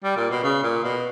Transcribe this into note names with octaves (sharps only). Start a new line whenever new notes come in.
G3
A#2
B2
C#3
A#2
B2